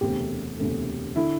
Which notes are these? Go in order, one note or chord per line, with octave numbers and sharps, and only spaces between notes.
E1 D2 C3 A3 G4
E1 D2 C3 A3
D3 E4